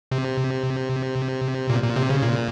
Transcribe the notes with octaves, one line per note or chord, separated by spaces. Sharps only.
C3
A#2
A#2
C3
C#3
A#2